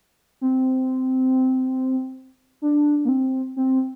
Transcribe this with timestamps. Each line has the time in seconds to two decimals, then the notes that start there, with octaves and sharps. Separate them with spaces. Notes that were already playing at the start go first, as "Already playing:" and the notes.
0.41 C4
2.62 D4
3.05 A#3
3.09 C4
3.56 C4